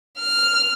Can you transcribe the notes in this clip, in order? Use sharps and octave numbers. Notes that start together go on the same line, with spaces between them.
F6